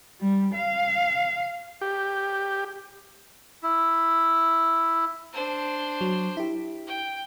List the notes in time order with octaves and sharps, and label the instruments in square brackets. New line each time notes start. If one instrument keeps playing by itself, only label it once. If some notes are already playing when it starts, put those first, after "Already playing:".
[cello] G3
F5
[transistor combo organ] G4
[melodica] E4
[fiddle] D4 C5
[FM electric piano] F#3
E4 G4
[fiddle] G5